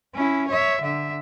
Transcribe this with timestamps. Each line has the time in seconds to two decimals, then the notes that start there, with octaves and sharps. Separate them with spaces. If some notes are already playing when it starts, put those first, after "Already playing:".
0.15 C#4 E4
0.48 C#5 E5
0.81 D3 E5